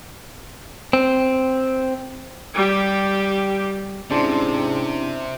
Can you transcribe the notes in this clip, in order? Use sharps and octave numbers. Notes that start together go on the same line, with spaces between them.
C4
G3 G4
G#2 C3 C#4 D4 E4 D5 A5 C6